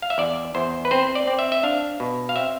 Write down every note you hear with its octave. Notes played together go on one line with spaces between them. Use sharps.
F5
E5
E2 D5
E2 C5
B4
C4 C5
D5
C4
E5
E5
D4 F5
B2
F5
C4 E5